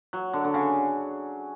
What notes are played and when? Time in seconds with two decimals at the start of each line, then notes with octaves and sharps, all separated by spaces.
0.13 F#3
0.33 D3
0.44 D3
0.54 C#3